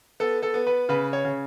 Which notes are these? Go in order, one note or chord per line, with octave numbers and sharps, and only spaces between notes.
B3 A4
A4
B3
B4
C#3 B4
C#5
C#3